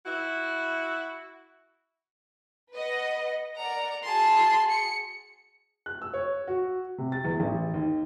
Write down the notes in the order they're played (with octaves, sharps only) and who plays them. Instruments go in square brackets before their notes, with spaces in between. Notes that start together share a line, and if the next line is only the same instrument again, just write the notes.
[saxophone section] E4 F#4
[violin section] B4 D#5 F#5
[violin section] A#4 D5 F#5 [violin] A#5
[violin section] F#4 G#4 [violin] A5 C6
[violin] C#7
[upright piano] F#6
E6
C#5
F#4
C3
A6
E2
A1
D#2